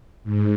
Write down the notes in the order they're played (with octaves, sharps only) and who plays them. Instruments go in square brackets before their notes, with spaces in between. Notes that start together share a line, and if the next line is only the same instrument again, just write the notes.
[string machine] G#2